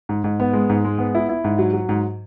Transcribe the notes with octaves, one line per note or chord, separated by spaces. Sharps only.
G#2
G#2
B3
G#3
G#2
G#3
B3
E4
E4
G#2
F#3
F#3
G#2